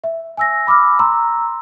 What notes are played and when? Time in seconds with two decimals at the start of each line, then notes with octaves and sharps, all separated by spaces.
0.04 E5
0.37 G#5 E6 A#6
0.67 B5 D6 E6 F6
0.99 A#5 C6 E6